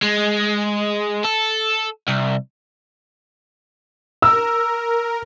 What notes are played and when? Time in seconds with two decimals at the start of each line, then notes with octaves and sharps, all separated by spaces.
0.02 G#3
1.24 A4
2.08 C2
4.22 A#4 E6